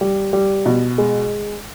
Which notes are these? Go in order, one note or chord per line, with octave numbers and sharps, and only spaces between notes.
G3
G3
B2
G#3